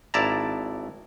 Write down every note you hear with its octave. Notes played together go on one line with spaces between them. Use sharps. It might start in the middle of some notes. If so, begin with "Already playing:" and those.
G#1 E4 D5 A5 A#5